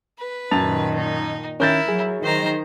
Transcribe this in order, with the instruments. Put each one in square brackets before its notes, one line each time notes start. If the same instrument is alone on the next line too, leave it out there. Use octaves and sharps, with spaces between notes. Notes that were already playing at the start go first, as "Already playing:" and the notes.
[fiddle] B4
[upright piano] F#2 A6 F7 [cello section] A#2 D#3 [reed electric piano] A5
[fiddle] D#4
[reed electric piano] D#3 C#4 [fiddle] E4 [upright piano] A#4 G6 A6
[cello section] F#3 [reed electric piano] G#4
[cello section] D#3 [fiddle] C5 A#5